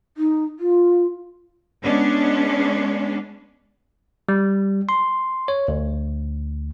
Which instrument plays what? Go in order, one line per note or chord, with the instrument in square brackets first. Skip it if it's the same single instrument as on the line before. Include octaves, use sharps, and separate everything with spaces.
[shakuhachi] D#4
F4
[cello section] G#3 B3 C#4 D4
[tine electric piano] G3
C6
C#5
D2